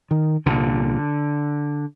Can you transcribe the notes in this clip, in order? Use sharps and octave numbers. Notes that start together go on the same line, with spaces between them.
D#3
C2 A#2 D3